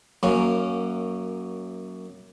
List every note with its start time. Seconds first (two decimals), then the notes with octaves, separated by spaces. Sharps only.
0.23 F#2 A#3 C#4